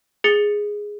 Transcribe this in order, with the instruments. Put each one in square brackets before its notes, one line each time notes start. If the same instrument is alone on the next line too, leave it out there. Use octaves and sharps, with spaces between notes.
[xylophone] G#4 A6 C#7 G7